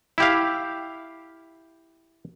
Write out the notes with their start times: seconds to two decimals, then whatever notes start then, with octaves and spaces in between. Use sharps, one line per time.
0.18 E4 G4 F5